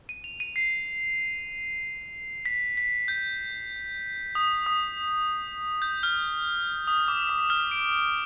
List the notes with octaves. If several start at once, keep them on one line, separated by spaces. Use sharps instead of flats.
D#7
F7
D#7
C7
B6
B6
G6
D#6
D#6
G6
F6
D#6
D6
D6
F6
D7